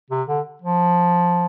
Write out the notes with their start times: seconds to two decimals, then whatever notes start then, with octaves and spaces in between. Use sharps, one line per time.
0.11 C3
0.28 D3
0.62 F3